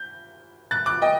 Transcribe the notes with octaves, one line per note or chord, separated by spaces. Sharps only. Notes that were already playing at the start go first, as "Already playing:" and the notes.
Already playing: G6
F#6 A6
D6 F#6
D#5 G5